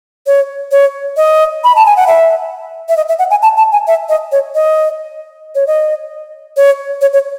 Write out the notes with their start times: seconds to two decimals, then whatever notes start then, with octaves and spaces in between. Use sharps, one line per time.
0.27 C#5
0.71 C#5
1.17 D#5
1.64 B5
1.76 A5
1.86 G#5
1.96 F#5
2.07 E5
2.89 E5
2.97 D#5
3.08 E5
3.19 F#5
3.30 G#5
3.42 A5
3.57 A5
3.72 G#5
3.87 E5
4.09 D#5
4.32 C#5
4.55 D#5
5.55 C#5
5.67 D#5
6.57 C#5
7.01 C#5
7.13 C#5